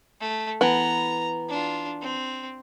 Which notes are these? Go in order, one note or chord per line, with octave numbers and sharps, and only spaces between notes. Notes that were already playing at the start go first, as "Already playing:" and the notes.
A3
E3 B3 A#5
D4 F4
C4